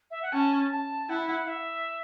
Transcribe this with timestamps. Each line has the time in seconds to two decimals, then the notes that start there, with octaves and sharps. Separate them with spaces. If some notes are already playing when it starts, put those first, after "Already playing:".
0.11 E5
0.22 F#5
0.33 C#4 A5
0.71 A5
1.09 E4 F#5
1.28 F#5
1.47 E5